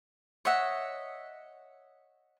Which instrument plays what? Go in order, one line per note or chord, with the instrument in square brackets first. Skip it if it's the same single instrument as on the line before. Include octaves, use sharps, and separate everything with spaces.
[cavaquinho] C#5 D#5 E5 F#5